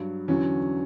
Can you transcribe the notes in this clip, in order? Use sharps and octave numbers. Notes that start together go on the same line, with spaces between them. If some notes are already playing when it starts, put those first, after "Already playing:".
Already playing: G2 F#3
E2 D3 F#3 C#4